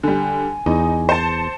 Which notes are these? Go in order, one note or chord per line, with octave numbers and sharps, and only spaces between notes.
D3 G3 G#5
E2 D#4
C5 A5 C#7